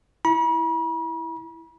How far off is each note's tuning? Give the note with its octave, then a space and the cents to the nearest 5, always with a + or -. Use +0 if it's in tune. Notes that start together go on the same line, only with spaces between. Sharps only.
E4 +0 B5 -45